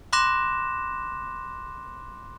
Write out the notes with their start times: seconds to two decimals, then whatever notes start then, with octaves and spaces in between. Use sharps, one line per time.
0.13 B5 C6 D6 F#6 A#6 E7